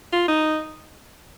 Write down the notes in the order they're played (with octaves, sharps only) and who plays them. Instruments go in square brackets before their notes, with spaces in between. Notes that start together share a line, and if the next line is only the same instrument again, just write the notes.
[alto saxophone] F4
D#4